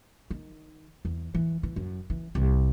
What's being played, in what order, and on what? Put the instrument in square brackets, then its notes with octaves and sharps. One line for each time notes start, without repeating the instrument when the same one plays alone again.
[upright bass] D#3
E2
E3
E3
F#2
E3
C2